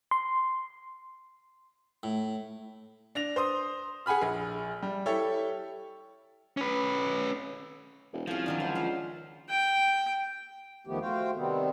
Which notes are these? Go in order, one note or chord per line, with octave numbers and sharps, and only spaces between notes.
C6
A2
D4 A#6 F7
C5 C6 D#6
G#4 F#5 G#5 B5 F6
A#1 G#4
G3
E4 G4 A4 C#5
C#4 B4
E1
C2 F3 C#4 G#4
D3 D#3 F#3
C#2 C5
C#4 F5
G5
E2 D#3 F3 A3 B3 G4
A3 F#4 C5 F5 G5
C3 D#3 G3 B3 C4